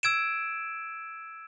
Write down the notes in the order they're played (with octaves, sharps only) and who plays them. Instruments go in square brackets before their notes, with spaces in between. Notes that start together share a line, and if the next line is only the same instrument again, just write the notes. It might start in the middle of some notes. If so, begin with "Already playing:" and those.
[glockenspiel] E6 G#6 D7 E7